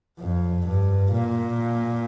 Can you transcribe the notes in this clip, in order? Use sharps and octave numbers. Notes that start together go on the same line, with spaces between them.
F2
G2
A#2